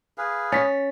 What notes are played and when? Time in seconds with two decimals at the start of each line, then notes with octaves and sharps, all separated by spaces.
0.18 G#4 B4 F5
0.52 C#4 A6 B6